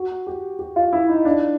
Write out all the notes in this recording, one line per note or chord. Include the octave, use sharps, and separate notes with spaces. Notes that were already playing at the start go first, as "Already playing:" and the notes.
Already playing: F#4
G4
G4
F4
E4
D#4
D4